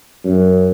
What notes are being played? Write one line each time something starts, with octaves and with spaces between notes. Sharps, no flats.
F#2